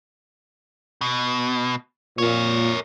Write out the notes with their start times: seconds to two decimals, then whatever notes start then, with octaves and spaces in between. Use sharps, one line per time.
1.01 B2
2.18 A#2 A#4 C#5